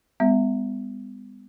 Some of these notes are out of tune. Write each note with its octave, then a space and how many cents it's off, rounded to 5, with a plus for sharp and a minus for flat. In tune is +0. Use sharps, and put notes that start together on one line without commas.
G#3 -40 B3 +30 E5 +0